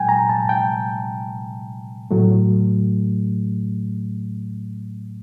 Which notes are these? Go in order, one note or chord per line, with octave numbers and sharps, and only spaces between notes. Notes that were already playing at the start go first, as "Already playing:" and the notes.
Already playing: A#2 F#3 G5 G#5
A#5
A5
G5
A2 F#3 A3